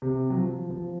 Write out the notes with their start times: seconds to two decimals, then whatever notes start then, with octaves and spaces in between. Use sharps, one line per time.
0.02 C3
0.30 F#3
0.36 F3
0.70 F3